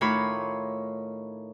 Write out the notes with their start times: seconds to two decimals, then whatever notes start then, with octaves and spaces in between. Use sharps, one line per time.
0.01 A2 D#3 F4 C#5 B5 D6